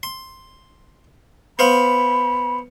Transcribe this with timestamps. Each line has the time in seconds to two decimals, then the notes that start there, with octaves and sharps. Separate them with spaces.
0.03 C6
1.59 B3 C5 F5 B5